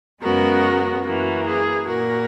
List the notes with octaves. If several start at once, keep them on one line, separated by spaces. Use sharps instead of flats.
F#2 C#3 G#3 B3 F#4 A#4
F#2 E3 A#3 F#4
G#4
A#2 A#3 F#4 A#4